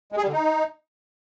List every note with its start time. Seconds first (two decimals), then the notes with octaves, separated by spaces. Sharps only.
0.12 G#3
0.17 G#4
0.22 G3
0.28 D3
0.33 D#4